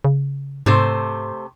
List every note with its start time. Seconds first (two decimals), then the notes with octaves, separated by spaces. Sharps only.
0.04 C#3
0.66 G#2 C3 A3 C5